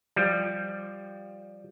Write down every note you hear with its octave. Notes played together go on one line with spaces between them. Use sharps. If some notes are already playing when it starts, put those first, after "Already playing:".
F3 G3